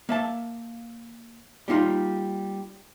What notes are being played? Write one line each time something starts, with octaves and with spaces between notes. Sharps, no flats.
A#3 E5 A5
G3 A#3 D#4 F4